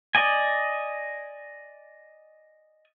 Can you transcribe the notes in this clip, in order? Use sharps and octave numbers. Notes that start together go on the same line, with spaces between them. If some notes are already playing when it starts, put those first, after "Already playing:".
D5 D#5 G#5